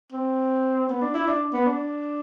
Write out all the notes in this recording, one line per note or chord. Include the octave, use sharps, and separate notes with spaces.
C4
B3
D4
E4
D4
B3
D4